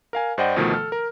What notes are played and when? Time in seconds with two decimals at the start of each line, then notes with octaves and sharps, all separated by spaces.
0.13 A#4 F5 G#5
0.38 G2 C5 D5 D#5 F#5 G5
0.56 D2 B2 D#3 F3 A3
0.73 A4 F6
0.92 A#4